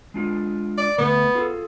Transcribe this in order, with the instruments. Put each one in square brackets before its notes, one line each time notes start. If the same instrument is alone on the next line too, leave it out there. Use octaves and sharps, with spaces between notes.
[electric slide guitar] G#3 D4 F4
[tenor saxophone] D5
[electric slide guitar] D3 A3 [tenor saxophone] B3
[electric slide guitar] F4 G#4 A4